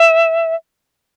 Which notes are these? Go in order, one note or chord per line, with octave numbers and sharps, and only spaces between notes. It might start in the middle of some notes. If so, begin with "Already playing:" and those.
Already playing: E5